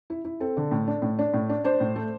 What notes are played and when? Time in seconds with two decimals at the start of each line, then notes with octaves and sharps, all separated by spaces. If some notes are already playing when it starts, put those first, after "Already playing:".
0.10 E4
0.25 E4
0.40 C4 A4
0.57 D3
0.71 A2
0.87 D4
1.02 A2
1.19 D4
1.34 A2
1.49 D4
1.64 D4 C5
1.80 A2
1.96 A3